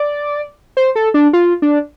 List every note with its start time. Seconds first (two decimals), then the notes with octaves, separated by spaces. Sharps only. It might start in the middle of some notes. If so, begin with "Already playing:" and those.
Already playing: D5
0.77 C5
0.96 A4
1.14 D4
1.33 F4
1.62 D4